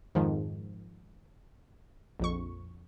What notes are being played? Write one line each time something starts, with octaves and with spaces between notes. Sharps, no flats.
F2 G#2 D#3 F3
A#1 F2 C#6